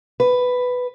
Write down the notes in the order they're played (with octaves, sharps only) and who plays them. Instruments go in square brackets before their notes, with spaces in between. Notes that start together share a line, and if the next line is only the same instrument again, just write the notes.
[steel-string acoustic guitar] B4